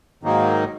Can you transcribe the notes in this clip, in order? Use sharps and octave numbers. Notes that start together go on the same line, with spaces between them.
G#2 D#3 F#3 A#3 D#4